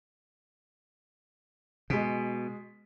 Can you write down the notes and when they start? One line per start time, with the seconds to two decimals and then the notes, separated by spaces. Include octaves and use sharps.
1.90 B2 G#3 B6